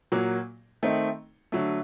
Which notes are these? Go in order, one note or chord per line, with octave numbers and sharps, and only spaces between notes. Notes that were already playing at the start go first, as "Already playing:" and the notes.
A#2 F#3 A#3 F#4
D#3 A3 C4 D#4
D3 F#3 A3